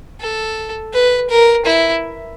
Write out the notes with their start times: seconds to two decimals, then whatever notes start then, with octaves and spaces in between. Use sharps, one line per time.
0.21 A4
0.94 B4
1.30 A#4
1.66 E4